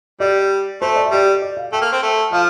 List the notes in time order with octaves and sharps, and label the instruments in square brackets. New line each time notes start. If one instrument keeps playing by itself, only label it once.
[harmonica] G3 [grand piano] D5
[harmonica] A3 [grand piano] C5
[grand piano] D5
E5
[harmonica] G3 [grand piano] D5
[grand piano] D5
F5
[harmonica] A3 [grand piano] G5
[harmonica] A#3
C4
A3
[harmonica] F3 [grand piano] F5